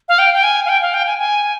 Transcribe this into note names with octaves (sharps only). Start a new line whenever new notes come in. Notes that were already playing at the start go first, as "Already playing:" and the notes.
F5
G5
G5
G#5
F5
G5
F5
G5
G#5
G#5